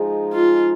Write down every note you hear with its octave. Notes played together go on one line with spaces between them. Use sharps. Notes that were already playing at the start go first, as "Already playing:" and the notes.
Already playing: F3 G#3 D#4 G#4
F4